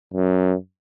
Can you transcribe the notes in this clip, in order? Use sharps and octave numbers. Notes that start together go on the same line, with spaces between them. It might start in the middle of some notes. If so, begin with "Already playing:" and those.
F#2